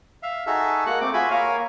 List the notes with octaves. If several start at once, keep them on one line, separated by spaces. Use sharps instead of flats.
E5 F5
D#4 F#4 G#4 A4 E5
G#3 A#3 F#4 F#5 F#6
A3 C4 D6
F4 F#4 G#4 E5 G#5 B5
A#3 A#4 C#5 F5 G#5